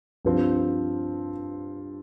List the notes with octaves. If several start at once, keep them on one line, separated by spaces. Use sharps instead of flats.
G2 F3 C4